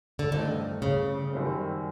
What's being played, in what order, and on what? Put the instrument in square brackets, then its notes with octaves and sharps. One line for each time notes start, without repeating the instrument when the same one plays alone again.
[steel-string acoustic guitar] D3
[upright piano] G2 E3 A3 C4 [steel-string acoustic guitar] D#3
[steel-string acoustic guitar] C#3
[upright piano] F#2 D#3 G3 C4